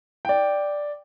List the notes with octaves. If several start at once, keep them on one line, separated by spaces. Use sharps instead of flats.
D5 G5